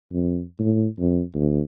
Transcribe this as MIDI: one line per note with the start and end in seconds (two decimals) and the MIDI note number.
0.12 0.42 41
0.59 0.87 45
0.99 1.21 41
1.35 1.61 38